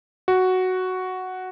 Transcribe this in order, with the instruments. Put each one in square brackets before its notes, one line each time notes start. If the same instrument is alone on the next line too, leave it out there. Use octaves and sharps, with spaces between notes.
[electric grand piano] F#4